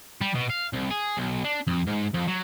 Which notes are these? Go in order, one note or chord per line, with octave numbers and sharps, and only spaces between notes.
G3
B2
F5
C2
G#4
B1
D4
F2
G#2
F2
F#3